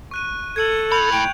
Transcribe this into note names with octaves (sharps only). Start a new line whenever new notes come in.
C#6 F#6 D#7
A4 G#6 C#7 F#7
A2 B5 G6 F7
G5